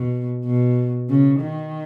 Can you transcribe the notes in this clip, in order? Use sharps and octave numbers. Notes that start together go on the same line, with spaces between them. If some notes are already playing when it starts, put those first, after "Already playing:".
Already playing: B2
B2
C#3
D#3